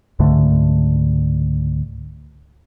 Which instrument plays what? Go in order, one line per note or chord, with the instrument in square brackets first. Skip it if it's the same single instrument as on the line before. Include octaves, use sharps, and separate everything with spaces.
[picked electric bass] C#2 G#2 D3 A3